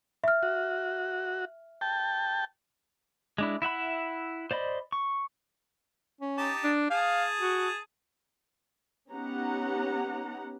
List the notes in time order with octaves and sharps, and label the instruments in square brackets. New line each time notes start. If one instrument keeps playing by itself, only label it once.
[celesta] E5 F6
[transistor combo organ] F#4
G5 A5
[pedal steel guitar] G#3 D4 E4
E4 E5 F#5 B5
C5 D5 D#5 B5
C#6
[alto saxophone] C#4
[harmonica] D#4 G4 A5
[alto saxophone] D4
[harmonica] G#4 A5 [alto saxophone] F5
[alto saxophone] F#4
[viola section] B3 C#4 D#4 G4 F#5 A#5